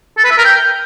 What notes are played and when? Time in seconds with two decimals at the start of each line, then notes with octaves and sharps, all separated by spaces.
0.18 A4
0.24 B4
0.31 E5
0.38 A#4
0.45 G5